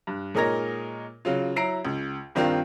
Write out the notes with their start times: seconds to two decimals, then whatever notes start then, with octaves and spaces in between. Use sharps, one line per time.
0.07 G2
0.34 A#2 G#3 D#4 A#4 C#5 A#6
1.25 C#3 F#3 F4
1.56 F#3 E4 A#5 C7 D7
1.85 C#2
2.35 G2 D#3 C4 D4 F4 A#4